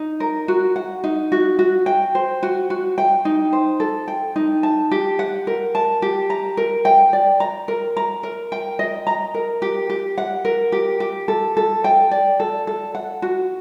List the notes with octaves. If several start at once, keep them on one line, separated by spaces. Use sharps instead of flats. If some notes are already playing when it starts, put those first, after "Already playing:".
Already playing: D#4
A#4
F#4
F#5
D#4
F#4
F#4
G5
C5
F#4
F#4
G5
D#4
C5
A4
G5
D#4
A5
G4
F#5
A#4
A5
G4
A#5
A#4
G5
D5
A#5
A#4
A#5
A#4
G5
D#5
A#5
A#4
G4
G4
F#5
A#4
G4
G4
A4
A4
G5
D5
A4
A4
F#5
F#4